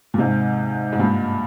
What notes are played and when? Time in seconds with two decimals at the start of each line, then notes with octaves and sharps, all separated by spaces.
0.14 A#2
0.18 G#2 C3
0.93 G#2
0.99 G2 A#2